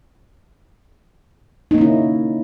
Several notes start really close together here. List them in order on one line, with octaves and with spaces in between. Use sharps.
D#4 A#3 C#4 E4